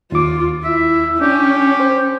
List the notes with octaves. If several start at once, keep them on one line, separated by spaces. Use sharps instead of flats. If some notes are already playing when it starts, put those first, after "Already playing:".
D#2 F4 D6
E4 E5
C#4 D4 G4
C5